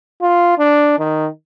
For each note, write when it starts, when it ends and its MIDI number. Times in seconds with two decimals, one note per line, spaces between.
0.21 0.57 65
0.58 0.96 62
0.99 1.27 51